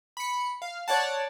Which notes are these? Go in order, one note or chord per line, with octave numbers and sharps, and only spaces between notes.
B5 C#7
F5
C#5 D5 F#5 A5